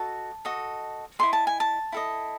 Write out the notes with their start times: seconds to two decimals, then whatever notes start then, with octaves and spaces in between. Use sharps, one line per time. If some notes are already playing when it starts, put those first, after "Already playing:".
Already playing: F#4 A4 D#5 A5
0.45 F#4 A4 D#5
1.19 E4 A4 D#5 C6
1.33 A5
1.47 G#5
1.60 A5
1.92 E4 A4 D#5